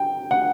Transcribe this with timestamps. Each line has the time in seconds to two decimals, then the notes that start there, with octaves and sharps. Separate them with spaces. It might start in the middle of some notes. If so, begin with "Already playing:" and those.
Already playing: G5
0.31 F#5